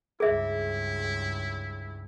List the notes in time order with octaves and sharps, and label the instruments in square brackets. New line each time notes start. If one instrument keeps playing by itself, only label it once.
[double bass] C#2 G2 [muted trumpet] E4 [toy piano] G#4 E5